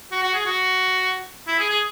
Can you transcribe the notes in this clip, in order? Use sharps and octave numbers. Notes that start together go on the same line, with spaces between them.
F#4
F#4
G#4
F#4
E4
G#4
G#4